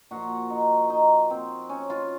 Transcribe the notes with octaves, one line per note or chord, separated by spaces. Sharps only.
A#2 F3 F#4
D#4
D#4
C4
C#4
F4